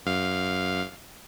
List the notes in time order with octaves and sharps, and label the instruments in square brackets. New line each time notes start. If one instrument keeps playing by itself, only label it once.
[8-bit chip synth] F#2 F5